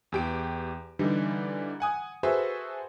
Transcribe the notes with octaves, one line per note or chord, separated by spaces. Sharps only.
E2 G4 D7
D3 E3 G3 D#4
F#5 G#5 D#6
F#4 G#4 A4 B4 C5 E5